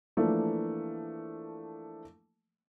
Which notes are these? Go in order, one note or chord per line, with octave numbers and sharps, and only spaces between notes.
E3 F3 A3 A#3 D4